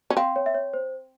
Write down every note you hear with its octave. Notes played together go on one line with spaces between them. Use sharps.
C#4
C4 F5
C#5
E5
C#5
C5